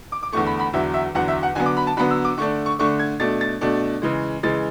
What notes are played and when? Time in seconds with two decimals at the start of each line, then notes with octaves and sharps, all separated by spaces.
0.12 D6
0.23 D6
0.32 E2 D3 A3 C#6
0.46 B5
0.60 B5
0.73 E2 D3 F#3 E5
0.94 E5
1.15 E2 D3 F#3 F#5
1.28 E5
1.43 F#5
1.55 D3 F#3 B3 G#5
1.66 D6
1.77 B5
1.87 A5
1.97 D3 F#3 B3 B5
2.11 E6
2.25 D6
2.37 D3 A3 D4 C#6
2.66 C#6
2.79 D3 A3 D4 C#6
2.99 G#6
3.20 B2 A3 D4 A6
3.41 A6
3.61 B2 A3 D4
4.02 C#3 E3 G#3
4.43 C#3 E3 G#3 A6